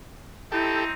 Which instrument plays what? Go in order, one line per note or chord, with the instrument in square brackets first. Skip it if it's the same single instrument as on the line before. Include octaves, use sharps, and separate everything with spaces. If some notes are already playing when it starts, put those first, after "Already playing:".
[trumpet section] C4 D#4 [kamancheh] E4 [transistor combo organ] G4 A4